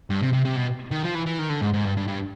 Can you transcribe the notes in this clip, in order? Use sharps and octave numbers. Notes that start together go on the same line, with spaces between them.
G2
C3
C3
C3
B2
D#3
F3
E3
E3
D#3
D3
G#2
G#2
G2
G2
G2